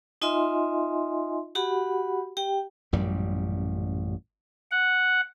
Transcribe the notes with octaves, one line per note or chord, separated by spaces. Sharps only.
D#4 F4 D#5 E5 G#5 C6
F#4 G4 F#5 B5
G4 G5
A1 F#2 A#2 G3
F#5